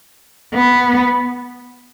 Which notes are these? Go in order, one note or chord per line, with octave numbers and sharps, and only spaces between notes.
B3